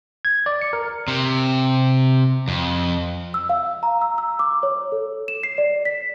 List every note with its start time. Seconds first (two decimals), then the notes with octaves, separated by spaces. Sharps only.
0.25 G#6
0.46 D5
0.62 C#7
0.73 A#4
1.08 C3
2.48 F2
3.34 E6
3.49 F5
3.83 A#5
4.01 E6
4.18 E6
4.39 D6
4.63 C#5
4.92 A4
5.28 E7
5.43 C7
5.58 D5
5.85 B6